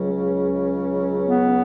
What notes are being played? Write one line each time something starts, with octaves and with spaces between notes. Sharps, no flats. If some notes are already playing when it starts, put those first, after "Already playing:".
Already playing: C#2 C#3 F#3
B3